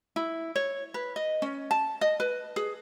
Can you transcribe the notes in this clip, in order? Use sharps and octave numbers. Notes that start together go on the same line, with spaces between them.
E4
C#5
B4
D#5
C#4
A5
D#5
B4
G#4